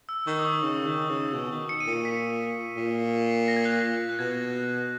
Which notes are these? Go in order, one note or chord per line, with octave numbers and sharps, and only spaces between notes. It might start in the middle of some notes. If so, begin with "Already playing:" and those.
E6
D#3 C#6
D#6
C#6
C#3
D#3
C#3
B2
D#3
C#7
D#7
A#2
C#7
B6
A#2
A#6
G#6
F#6
G#6
F#6
B2 G#6